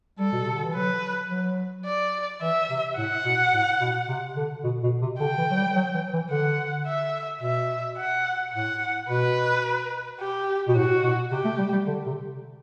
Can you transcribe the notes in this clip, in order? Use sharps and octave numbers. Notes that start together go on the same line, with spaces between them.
G3 A4
B2
C3
D3
E3
F#3 B4
F#3
D5
E3 E5
C3
A2 F#5
B2
A2
B2
C3
D3
B2
B2
C3
D3 G5
E3
F#3
G3
F#3
E3
E3
D3 F#5
E5
B2 E5
F#5
A2 F#5
B2 B4
G4
B2
A2 F#4
B2
C3 G4
A3
G3
G3
D3
C3